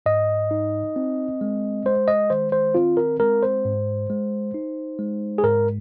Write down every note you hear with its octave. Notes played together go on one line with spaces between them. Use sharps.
G#2 D#5
D#4
C4
G#3
G#3 C5
D#5
D#3 C5
C5
C4 F4
A#4
G#3 A#4
C5
G#2
G#3
D#4
G#3
G#4
G#2 A#4